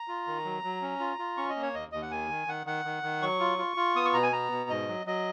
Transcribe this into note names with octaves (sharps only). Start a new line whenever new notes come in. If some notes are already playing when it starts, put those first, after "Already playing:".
Already playing: A#5
F4
D#3
F#3
F#3
C#4
F4
F4
C#4 C#6
D#5
A#3
C#5
D#2 D#5
D#2 D#5
F#5
D#3 G#5
D#3
D#3 F#5
D#3 F#5
D#3
D#3
F#3 C#6
F4
F4
F4
B3 D#6
C#6
B2 A#5
G#5
B3 A#5
B2
G#2 D#5
F#3
F#3 D#5